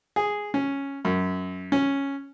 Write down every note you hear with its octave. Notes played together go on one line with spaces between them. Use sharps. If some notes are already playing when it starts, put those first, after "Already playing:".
G#4
C#4
F#2
C#4